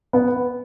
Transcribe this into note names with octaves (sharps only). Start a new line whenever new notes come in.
B3